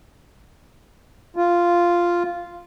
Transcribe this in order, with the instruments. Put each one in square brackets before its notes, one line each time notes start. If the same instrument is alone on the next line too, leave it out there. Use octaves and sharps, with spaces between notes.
[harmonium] F4